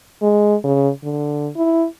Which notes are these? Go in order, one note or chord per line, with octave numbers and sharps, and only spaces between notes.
G#3
C#3
D3
E4